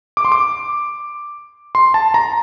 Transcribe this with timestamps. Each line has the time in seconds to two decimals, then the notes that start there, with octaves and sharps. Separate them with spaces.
0.17 D6
0.25 C6
0.32 D6
1.75 C6
1.94 A5
2.14 A#5